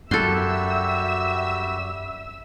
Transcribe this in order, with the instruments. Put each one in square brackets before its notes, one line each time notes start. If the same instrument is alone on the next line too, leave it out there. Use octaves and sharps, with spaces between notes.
[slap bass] F#2 [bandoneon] G3 F#4 G4 [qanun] A4 C6 [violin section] E5 E6